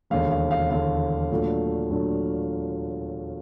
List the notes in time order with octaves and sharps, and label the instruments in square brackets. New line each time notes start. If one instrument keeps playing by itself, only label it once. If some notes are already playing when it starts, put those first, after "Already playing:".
[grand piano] E1 D#2 D3 F5
F5
F5
E1 D#2 D3 F5
A#2 F#3 A3 D4
A#2 F#3 A3 D4